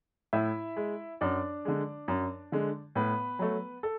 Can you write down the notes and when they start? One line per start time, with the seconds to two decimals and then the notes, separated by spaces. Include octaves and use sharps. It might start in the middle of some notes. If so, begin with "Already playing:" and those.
0.33 A2 E4 E5
0.76 G#3
1.21 F#2 D4 D5
1.65 D3 G#3
2.08 F#2
2.52 D3 G#3
2.95 A2 B3 B4
3.39 F#3 A3
3.83 A4